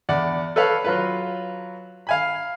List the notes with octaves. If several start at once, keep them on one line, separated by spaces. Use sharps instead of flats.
E2 D5 F#5
A4 B4 C#5 F5
F#3 F4 B4
F5 G#5 B5